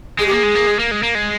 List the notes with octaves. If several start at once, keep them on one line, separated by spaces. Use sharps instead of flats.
G#3 G#4
G4
A#3 G#4
G#3
A#3
G#3
A#3
G#3
A#3
G#3